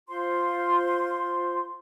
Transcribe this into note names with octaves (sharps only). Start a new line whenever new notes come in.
F4 C5 C6